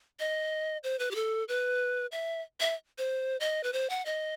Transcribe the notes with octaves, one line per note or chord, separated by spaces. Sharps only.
D#5
C5
B4
G4
A4
B4
E5
E5
C5
D#5
B4
C5
F#5
D#5